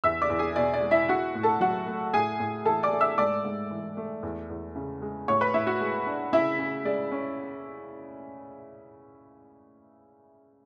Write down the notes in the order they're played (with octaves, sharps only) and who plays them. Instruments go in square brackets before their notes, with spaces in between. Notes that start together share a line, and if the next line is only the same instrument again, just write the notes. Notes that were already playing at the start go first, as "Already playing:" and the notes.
[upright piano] E2 E5 E6
D5 D6
E2
G#4 G#5
B2 D5
D5
G#3
E4 E5
E4 F#4 F#5
A2
A4 A5
F#3 F#4 F#5
A3
A2 G#4 G#5
A2
E3 A4 A5
D5 D6
A3
E5 E6
G#2 D5 D6
G#2
E3
A3
E2
E2
C#3
G#3
A2 C#5 C#6
B4 B5
A2 E4 E5
F#4 F#5
G#3
D4
C#3 E4 E5
C#3
G#3 D5
C#4